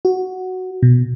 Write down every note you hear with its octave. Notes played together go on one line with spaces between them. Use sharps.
F#4
B2